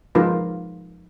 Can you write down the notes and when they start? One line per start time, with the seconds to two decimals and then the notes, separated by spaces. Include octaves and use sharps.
0.15 F3 G#3 D#4 F4 A#4 B4